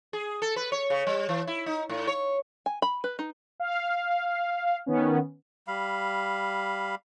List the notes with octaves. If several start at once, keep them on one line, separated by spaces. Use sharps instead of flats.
G#4
A4
B4
C#5
C#3
G3
E3
E4
D#4
A2
C#5
G#5
B5
B4
D#4
F5
D#3 B3 C#4
G3 F5 B5